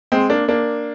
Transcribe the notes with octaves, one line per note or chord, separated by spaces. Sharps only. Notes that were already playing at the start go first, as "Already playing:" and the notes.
G#3 C4
A#3 D4
A#3 D4